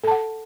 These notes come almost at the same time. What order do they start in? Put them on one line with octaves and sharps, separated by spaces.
A4 A5 F#5